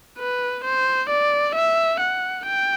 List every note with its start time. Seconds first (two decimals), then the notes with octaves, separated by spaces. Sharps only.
0.19 B4
0.65 C5
1.10 D5
1.55 E5
2.00 F#5
2.46 G5